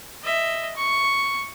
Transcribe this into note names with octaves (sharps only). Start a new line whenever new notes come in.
D#5 E5
C#6